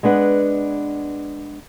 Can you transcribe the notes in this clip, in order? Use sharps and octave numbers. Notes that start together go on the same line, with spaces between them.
G#3 B3 D4 B4 F#5